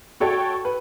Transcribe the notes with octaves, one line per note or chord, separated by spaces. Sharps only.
F#4 A4 C#5 G5
B4